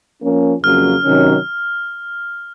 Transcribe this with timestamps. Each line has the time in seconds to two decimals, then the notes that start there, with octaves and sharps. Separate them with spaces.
0.22 F3 A#3 C#4
0.63 F2 C#3 F#3 A#3 C#4 F6
1.03 C3 D#3 F#3 C#4